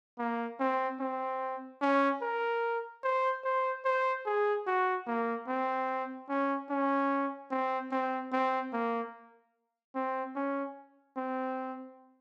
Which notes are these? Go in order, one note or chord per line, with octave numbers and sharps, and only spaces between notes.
A#3
C4
C4
C#4
A#4
C5
C5
C5
G#4
F#4
A#3
C4
C#4
C#4
C4
C4
C4
A#3
C4
C#4
C4